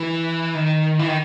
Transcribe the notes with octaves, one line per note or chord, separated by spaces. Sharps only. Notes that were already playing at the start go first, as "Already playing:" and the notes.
Already playing: E3
D#3
E3
D#3